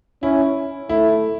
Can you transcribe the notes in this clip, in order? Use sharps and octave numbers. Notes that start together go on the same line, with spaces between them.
C#4 E4
A3 E4